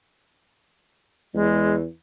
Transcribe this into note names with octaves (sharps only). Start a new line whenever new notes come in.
E2 G#3